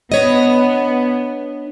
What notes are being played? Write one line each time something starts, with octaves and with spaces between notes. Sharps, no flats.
B3 D4 C#5 D#5